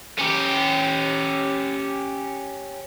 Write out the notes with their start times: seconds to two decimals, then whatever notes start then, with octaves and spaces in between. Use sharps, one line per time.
0.18 C#4 G4